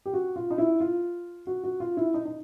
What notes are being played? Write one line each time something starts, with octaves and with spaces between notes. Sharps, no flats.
G4
F#4
F4
D#4
E4
F4
F#4
F#4
F4
E4
D#4
D#4